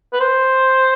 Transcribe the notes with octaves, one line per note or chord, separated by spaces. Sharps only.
B4
C5